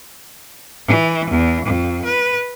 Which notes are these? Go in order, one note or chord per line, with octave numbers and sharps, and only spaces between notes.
E3
E2
F2
B4